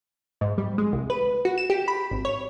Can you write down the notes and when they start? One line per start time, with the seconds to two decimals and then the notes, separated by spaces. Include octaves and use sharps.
0.41 G#2
0.58 G3
0.78 G#3
0.93 C2
1.10 B4
1.45 F#4
1.58 E7
1.70 G4
1.88 B5
2.11 G#1
2.25 C#5